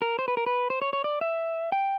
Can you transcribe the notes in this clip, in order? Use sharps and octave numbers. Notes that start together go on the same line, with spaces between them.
A#4
C5
B4
A#4
B4
C5
C#5
C#5
D5
E5
G5